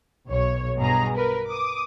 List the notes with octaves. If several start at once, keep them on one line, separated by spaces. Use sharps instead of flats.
B1 C#5
G2 B2 G#4 A#5
A#4 B4
D6 D#6